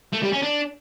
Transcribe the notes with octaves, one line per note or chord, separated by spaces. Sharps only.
A3
G3
C#4
D4